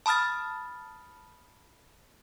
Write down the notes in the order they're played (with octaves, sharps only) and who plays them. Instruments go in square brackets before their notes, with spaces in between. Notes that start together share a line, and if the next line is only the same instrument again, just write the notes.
[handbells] A5 B5 D#6 F6 A6